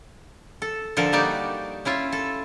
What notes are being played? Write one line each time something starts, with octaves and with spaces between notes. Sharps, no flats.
A4
D3 F3 A4 A#4
G3 A#3 D#4 F#4 G4 D5
C#4 E4 F4 E5
A4